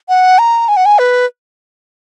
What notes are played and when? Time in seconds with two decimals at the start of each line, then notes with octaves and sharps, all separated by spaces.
0.09 F#5
0.39 A#5
0.68 G#5
0.77 F#5
0.86 G#5
0.99 B4